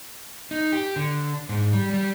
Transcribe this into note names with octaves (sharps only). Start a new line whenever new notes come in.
D#4
G4
D3
G#2
G3
G3